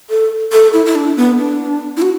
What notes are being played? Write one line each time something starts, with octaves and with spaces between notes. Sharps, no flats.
A4
A4
E4
E4
D4
B3
D4
E4
F#4